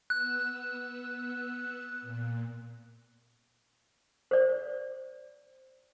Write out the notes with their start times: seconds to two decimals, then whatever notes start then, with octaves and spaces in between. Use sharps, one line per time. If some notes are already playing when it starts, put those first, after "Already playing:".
0.10 B3 E6 F#6
2.01 A#2
4.31 C5 D5